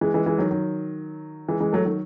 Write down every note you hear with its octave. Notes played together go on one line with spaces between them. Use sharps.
E3 G#3
E3 G#3
E3 G#3
D#3 F#3
D#3 F#3
E3 G#3
E3 G#3
F#3 A3
D#3 F#3